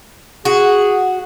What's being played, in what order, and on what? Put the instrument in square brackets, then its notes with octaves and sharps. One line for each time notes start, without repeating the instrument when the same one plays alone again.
[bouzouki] F#4 [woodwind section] G#4